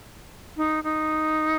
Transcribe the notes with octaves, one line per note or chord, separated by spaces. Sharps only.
D#4
D#4